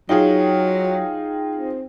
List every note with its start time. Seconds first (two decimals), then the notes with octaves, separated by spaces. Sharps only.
0.09 F#3 D#4 F4 G#4 G5
1.55 C4